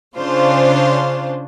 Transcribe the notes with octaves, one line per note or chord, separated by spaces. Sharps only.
C#3 C#4 D4 F4 C5